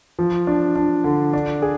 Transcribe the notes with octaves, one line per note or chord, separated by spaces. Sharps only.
F3
D4
D4
D3
D4
G#4